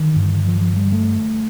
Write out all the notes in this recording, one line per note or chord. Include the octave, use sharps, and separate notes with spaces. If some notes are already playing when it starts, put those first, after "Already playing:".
Already playing: D#3
G2 D3
F3
F3
G3
A3